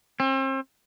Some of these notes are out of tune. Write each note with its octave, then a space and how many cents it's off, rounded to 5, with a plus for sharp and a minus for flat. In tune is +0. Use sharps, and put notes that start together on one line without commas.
C4 +40